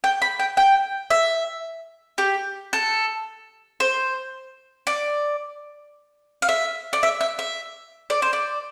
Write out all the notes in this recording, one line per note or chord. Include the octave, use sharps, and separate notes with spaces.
G5
B5
G5
G5
E5
G4
A4
C5
D5
F5
E5
D5
E5
E5
E5
D5
C5
D5